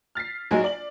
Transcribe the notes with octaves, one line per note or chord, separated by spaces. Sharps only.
F6 A6 B6 C7
A#1 F#3 G#3 D#4 G#4 G#5
D5 F#7